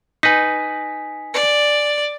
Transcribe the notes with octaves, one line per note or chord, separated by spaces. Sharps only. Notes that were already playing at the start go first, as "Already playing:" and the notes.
D#4 B4 G#5 B6
D5